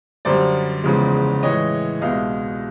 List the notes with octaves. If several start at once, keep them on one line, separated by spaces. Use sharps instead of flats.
F#2 D3 G3 C5 D5
E2 C#3 F3 G#3
A2 E3 G#3 C#5 D#5
C2 B2 G#3 D#5 F5